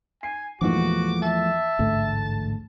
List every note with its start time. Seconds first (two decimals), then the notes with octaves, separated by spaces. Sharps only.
0.23 G#5 C7
0.61 E2 A#2 F3 G#3 A3 F#4 D6
1.22 E5 A5
1.79 A1 D2 G#2 A3